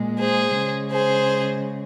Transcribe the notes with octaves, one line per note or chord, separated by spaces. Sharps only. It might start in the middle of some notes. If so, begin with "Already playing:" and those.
Already playing: A#2 G#3
G#4 C5
C#3 G#3
G#4 C5